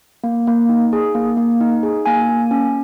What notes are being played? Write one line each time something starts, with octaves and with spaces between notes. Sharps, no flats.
A#3
A#3
D#4
G#4
A#3
A#3
D#4
G#4
A#3 G#5
A#3
C#4